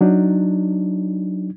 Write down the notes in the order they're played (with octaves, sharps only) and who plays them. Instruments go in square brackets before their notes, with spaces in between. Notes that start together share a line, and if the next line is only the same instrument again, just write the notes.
[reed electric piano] F#3 D4 D#4